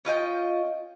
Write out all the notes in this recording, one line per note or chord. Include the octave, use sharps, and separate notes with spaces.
C#4 F4 D#5 G5